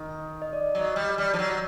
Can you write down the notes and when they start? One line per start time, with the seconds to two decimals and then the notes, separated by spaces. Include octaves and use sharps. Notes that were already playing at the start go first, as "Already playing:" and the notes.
Already playing: D#3
0.42 D#5
0.53 D5
0.75 F#3
0.81 D#5
0.96 G3
1.11 D5
1.18 G3
1.33 F3
1.39 F#3